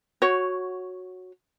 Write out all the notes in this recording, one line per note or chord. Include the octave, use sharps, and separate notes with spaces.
F#4 C#5